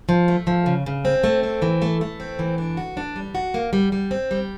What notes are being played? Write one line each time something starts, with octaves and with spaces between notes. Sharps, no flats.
F3
A3
F3
C#3
C#3
C4
A3
C4
E3
A3
A3
C4
E3
D4
F#4
D4
G3
F#4
A#3
G3
G3
C4
G3